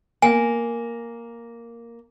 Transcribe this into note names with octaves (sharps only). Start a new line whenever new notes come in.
A#3 G#5